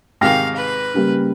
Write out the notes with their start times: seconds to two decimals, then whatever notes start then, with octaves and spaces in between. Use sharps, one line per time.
0.21 G#2 C3 D#3 F5 G5 F6 A#6
0.56 B4
0.94 C#3 G3 A#3